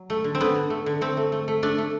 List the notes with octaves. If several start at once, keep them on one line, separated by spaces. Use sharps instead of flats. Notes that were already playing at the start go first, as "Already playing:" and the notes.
Already playing: F#3
A3
D3
C4
D3 B3
D3
A3
D3
A3 C4
A3
A3
A3
A3 D4
A3